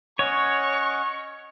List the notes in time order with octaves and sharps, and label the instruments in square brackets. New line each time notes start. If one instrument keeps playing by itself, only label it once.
[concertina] C#4 D#5 F#5 [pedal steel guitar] C#5 [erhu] C#6